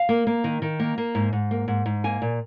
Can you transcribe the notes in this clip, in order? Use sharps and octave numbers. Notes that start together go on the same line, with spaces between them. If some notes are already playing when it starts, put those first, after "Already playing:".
Already playing: F5
A#3
A#3
D#3
D#3
A#3
A#3
G#2
G#2
A#3
G#2
G#2
A#3 G#5
A#2